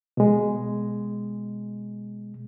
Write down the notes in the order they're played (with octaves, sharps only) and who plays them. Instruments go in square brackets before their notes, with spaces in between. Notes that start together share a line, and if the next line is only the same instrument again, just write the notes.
[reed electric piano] B2 G#3